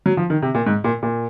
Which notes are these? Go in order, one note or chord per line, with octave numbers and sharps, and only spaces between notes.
F#3
F3
D#3
C3
A#2
G#2
A#2
A#2